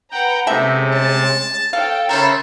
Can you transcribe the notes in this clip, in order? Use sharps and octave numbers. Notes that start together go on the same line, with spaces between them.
B4 F#5 G5 A#5
C3 G#3 C#4 D#4 A4 E5
A5
A4 C#5 F5 G5
C#3 A4 A#4 C5 C#5 E5 B5 E6